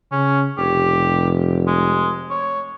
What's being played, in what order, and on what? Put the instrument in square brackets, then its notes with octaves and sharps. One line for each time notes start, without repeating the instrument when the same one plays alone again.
[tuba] C#3 [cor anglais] C#4
[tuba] F1 [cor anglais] G4
[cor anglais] G#3
C#5